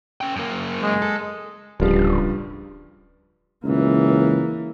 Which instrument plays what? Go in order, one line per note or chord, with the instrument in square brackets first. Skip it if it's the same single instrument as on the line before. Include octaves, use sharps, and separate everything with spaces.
[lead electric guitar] C#4 G5
F#2 A#3
[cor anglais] G#3
[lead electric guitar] A4
[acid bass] D1 [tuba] G2 [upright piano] C#3 F3 G3
[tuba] C#2 [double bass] E3 A#3